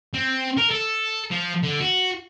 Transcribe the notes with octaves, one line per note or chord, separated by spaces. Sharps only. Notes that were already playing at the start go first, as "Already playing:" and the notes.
C4
A#4
A4
F3
D3
F#4